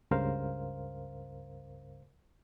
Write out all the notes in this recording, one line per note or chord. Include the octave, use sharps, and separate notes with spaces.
C#2 G2 C#3 A#4 C5 F5